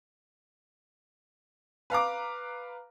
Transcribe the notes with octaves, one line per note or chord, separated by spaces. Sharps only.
B4 F5 A#5 D6